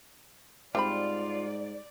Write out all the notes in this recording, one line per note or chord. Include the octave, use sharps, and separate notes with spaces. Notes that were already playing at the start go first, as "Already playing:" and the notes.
G#2 G3 C4 F4 D5 B5